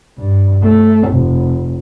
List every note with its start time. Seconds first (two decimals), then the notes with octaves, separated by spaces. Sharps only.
0.19 G2
0.63 A3
1.09 F1